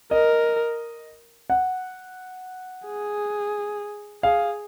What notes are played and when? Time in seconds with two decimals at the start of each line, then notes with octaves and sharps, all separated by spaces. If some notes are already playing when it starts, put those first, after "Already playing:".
0.11 A#4 D#5
1.50 F#5
2.86 G#4
4.23 G#4 F5